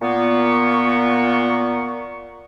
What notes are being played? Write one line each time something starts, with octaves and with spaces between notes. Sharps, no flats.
A#2 B3 C#6